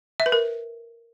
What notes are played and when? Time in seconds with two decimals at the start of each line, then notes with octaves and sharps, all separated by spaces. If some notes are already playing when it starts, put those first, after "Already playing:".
0.20 E5
0.26 B4
0.32 A#4